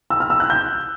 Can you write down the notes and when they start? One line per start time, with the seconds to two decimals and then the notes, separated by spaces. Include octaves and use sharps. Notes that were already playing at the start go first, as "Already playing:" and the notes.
0.10 E6
0.20 F6
0.30 E6
0.40 F#6
0.50 G6